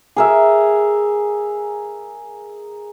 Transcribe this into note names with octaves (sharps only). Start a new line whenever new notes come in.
G#4 A#4 E5